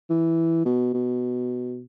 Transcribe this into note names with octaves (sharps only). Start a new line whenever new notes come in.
E3
B2
B2